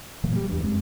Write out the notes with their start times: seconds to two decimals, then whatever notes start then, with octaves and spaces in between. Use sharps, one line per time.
0.24 A#2 E3 F#3 A#3
0.36 G3
0.50 E2 G2
0.64 F#2 G#3 C4